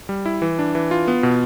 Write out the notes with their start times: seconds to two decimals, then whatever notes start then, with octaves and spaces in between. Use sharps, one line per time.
0.09 G3
0.26 E4
0.42 E3
0.59 D4
0.75 E3
0.91 F4
1.08 B3
1.23 B2